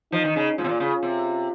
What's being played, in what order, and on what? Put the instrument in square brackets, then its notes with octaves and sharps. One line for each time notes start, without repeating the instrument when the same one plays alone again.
[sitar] F3 [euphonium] D#4
[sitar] D#3
C#3
[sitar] G#2 [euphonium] F4
[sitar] C3
A#2
C#3
C3